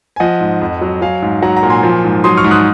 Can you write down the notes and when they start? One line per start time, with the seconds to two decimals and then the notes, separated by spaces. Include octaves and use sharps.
0.16 G#5
0.20 F3 D#5 F#5
0.41 G#2
0.61 F2
0.81 F#3
1.02 F#3 F5 G#5
1.22 G#2
1.42 F#3 F#5 A#5
1.57 F#5 A#5
1.63 A#2
1.70 G#5 C6
1.83 F3
2.04 G#2
2.24 F#3 C6 D#6
2.37 C#6 F6
2.44 G#2
2.51 D#6 F#6